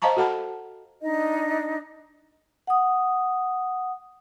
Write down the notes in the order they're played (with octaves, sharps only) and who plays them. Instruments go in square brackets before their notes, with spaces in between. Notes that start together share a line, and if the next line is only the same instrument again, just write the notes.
[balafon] C5 D#5 F5 A5 A#5 C#6
F#4 A4 F#5 A5 B5
[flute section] D4 D#4 D#5
[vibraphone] F#5 D#6